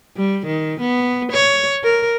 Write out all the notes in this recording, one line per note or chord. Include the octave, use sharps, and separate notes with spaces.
G3
D#3
B3
C#5
A#4